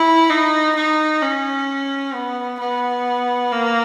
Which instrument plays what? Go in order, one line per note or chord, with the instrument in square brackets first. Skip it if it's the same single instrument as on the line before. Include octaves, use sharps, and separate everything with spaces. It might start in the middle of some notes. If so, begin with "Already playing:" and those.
Already playing: [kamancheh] E4
D#4
D#4
C#4
B3
B3
A#3